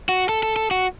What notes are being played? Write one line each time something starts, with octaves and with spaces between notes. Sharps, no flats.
F#4
A4
A4
A4
F#4